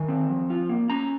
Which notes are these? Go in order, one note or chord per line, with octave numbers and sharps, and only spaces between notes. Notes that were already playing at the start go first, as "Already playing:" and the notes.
Already playing: D#3 G#5
C4
F3
F4
A#3
C#4 A#5